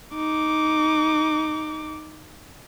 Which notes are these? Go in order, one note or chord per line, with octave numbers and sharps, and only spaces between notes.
D#4 D6